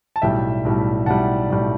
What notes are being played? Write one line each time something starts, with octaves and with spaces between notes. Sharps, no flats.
A5
B1 A2 G3 E5 G5
B1 A2 G3
B1 A2 G3 F#5 A5
B1 A2 G3